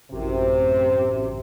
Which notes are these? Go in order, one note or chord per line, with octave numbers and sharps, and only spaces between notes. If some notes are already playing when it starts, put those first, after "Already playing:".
A1 F#2 C3